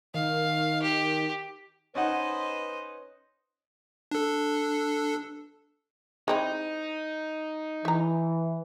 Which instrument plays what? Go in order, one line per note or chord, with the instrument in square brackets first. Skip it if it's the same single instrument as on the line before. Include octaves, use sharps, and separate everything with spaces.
[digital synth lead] D#3 [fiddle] F5
[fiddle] G4
[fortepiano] C#4 D#4 F#5 [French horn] B4 [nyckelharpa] C5 D#5
[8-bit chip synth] D4 A4
[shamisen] G#3 C4 E4 [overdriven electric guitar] D#4
[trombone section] E3 [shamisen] E5 A#5